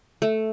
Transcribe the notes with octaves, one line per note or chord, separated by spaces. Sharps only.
A3